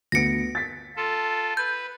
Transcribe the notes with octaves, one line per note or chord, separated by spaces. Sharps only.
D2 B3 A#6 C#7 D7
A6 B6
F4 A4
B4 G6